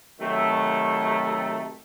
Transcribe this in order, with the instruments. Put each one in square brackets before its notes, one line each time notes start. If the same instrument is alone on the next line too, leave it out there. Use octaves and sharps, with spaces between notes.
[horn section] C3 D#3 F#3 A3